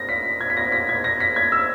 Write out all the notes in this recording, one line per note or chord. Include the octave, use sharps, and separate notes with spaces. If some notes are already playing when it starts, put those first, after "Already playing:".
Already playing: A#6
B6
G#6
B6
A#6
B6
G#6
A#6
B6
G#6
E6